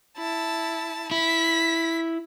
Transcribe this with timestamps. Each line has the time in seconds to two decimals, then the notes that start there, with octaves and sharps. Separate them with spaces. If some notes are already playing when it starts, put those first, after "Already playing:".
0.18 E4 A5
1.11 E4 B6